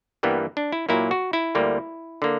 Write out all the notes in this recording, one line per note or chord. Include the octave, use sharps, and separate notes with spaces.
G2 E3 G3 A#3 B3
D4
E4
A#2 F#3 A#3 E4
F#4
E4
D2 D3 G3 A#3
D3 A#3